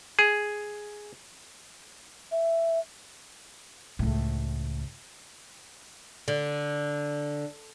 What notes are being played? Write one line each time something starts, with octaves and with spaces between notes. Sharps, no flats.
G#4
E5
C#2 A2
D3